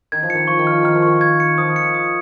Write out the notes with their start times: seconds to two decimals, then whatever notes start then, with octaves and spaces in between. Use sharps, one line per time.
0.12 D#3 G#6
0.23 F3
0.30 D#3 C#7
0.47 F3 C#6
0.59 D#3
0.67 F3 F6
0.83 D#3 F6
0.95 F3
1.03 D#3 C#6
1.21 G#6
1.40 C#7
1.58 F3 D#6
1.76 C#7
1.94 D#6